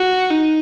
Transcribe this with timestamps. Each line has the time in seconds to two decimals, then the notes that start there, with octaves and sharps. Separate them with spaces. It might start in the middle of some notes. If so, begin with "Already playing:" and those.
Already playing: F#4
0.31 D#4